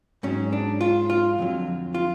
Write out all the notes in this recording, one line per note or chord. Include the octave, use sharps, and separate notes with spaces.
G#2 F#3 C#4
D4
F4
F4
F2 D3 F#3
F4